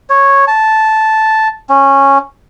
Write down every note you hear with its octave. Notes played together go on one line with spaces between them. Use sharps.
C#5
A5
C#4